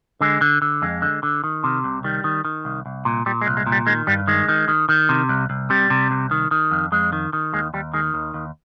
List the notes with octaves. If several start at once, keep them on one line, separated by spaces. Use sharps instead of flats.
D3 G#3
D3
D3
F2 G#3
D3
D3
D#3
C3
C2
D#3 G3
D#3
D#3
C2
C2
A#2
A#2 G3
G#3
C2
G#3
A#2
G3
D#3 G#3
G2 G3
D#3 G#3
D#3
D#3
D#3
C3
C2
C2
C3 G3
C3
C2
D#3
D#3
F2
F2 G#3
D#3
D#3
D#2 G#3
D#2 G3
D#3 G#3
D#2
D#2